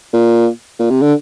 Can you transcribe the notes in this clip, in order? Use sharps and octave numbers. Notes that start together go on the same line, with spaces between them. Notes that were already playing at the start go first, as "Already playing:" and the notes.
A#2
A#2
C3
D3